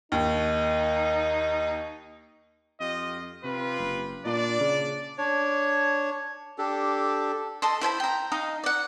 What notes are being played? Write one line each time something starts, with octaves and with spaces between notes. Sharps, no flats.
D#2 D#4
F2 F4 G4 D#5
C3 F4 G4 B4
F#1
A#2 D4 D5
C#3
D4 C#5
D4 G4 A4
A4 D#5 C6
E4 C5 G#5 B5
G5 A#5
D#4 D#5 F5
D5 F#5